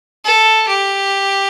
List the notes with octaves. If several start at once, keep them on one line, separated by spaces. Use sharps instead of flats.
A4
G4